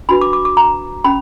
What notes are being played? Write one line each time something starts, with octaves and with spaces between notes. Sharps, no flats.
D4 F#4 B4 B5
D6
D6
D6
A#5
C#4 B5